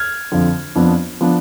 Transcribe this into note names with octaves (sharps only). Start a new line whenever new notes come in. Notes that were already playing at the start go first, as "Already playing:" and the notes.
Already playing: F6 G#6
F2 D3 F3
F2 F3 B3 D4
F3 B3 D4